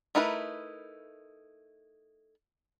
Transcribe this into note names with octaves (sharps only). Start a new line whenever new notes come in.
A3 D#4 E4 A#4 B4